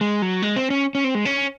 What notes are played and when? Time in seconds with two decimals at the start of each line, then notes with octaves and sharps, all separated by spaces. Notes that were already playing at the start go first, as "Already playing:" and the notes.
0.01 G#3
0.22 F#3
0.42 G#3
0.56 C4
0.70 C#4
0.95 C#4
1.04 C4
1.15 G#3
1.25 C#4